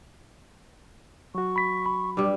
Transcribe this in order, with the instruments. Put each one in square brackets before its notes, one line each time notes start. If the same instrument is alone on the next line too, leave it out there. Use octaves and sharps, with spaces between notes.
[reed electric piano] F#3 F#4 [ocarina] C#6
[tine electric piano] B5 B6
B5
[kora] G2 G3 [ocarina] D6